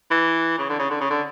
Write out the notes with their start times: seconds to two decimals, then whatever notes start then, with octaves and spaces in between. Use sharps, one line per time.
0.11 E3
0.58 C#3
0.69 D3
0.79 C#3
0.90 D3
1.01 C#3
1.10 D3